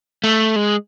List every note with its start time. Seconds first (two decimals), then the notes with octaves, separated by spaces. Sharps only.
0.24 A3
0.56 G#3